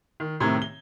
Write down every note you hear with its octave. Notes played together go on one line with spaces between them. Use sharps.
D#3
A2 C3 D#3 C4 A#5 G#6
G7